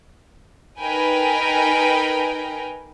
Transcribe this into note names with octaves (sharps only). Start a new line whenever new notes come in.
D#4 A#4 B4 G5 G#5